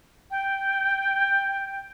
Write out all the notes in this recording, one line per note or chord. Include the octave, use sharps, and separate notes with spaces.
G5